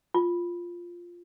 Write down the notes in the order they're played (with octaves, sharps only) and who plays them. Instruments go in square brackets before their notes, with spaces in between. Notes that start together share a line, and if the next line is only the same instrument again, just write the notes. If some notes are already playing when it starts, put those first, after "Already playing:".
[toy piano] F4